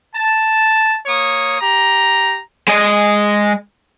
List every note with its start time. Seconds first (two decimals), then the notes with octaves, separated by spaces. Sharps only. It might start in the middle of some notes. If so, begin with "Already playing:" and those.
0.15 A5
1.06 A#3 C#5 D#6
1.61 G4 A#5
2.68 G#3 D#5